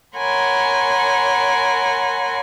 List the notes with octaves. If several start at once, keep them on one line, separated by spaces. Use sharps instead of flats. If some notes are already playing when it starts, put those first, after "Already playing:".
A#4 C#5 F#5 G#5 B5 C6